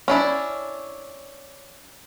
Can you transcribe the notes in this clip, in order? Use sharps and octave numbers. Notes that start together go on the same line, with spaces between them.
C#4 D4 E4